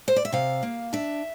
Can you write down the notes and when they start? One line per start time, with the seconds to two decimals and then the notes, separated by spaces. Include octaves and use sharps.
0.08 C5
0.16 D5
0.25 E5
0.32 C3 F5
0.63 A#3
0.93 D4 E5